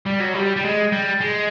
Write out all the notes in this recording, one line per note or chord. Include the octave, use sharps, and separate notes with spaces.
G3
F#3
G3
G3
G#3
G3
G#3